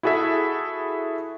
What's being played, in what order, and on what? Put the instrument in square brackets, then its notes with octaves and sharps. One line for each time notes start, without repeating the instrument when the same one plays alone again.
[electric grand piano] E4 F#4 G#4 A4 E5